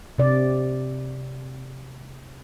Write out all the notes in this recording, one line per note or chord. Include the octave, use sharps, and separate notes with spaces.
C3 D5